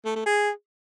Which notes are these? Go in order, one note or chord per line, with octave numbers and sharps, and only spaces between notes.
A3
A3
G#4